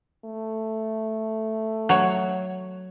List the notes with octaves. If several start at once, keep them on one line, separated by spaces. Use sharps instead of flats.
A3
F#3 C#5